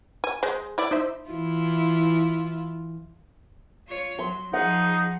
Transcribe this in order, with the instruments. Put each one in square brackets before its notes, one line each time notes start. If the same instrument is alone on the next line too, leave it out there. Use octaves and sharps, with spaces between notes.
[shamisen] G#5
[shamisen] G#3 [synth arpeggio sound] C5
[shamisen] E4 D5
[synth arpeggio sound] D#4 C5 E5
[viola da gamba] E3 E4 F4
[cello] F4 C#5
[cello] F#3 [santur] C6
[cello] F3 G#4 [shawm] D#4 [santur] F#5